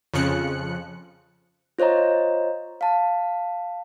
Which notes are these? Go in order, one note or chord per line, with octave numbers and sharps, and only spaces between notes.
F2 C#3 F3 F#6 C#7
F4 C5 C#5 D#5 A#5
F5 A5